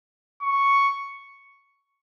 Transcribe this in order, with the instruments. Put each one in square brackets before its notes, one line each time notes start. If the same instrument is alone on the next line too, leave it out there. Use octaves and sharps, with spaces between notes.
[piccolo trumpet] C#6